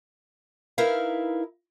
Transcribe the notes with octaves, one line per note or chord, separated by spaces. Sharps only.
D#4 E4 A#4 B4 E5 F5